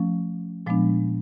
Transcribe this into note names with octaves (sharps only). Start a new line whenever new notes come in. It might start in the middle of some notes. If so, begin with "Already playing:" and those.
Already playing: F3 A3 C#4
A#2 F3 G#3 B3 D4